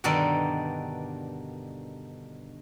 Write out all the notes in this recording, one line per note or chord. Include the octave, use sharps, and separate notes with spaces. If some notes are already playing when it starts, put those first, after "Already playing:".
G2 B2 D3 D#3 A4 D5